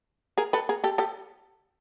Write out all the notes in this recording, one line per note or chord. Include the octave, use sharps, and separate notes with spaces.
G#4 A#4
A4 B4
G#4 A#4
G4 A4
G4 A4